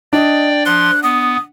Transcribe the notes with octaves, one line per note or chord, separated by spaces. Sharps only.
D4 D5 D#5 G5
F3 C6 F#6
B3 D#6